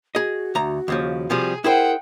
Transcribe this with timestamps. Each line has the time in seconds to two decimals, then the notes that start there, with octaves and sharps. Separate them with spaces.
0.15 F#4 G#4 D#5
0.55 D2 A#5
0.88 D#2 C#3 F3
1.30 C3 F3 G3 G#4
1.64 E4 G#4 A#4 C5 F#5 G5